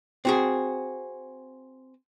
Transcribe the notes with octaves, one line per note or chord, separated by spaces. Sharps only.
C4 F#4 G#4